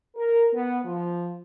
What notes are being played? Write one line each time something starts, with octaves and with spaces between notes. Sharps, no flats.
A#4
B3
F3